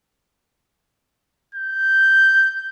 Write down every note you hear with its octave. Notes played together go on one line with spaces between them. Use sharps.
G6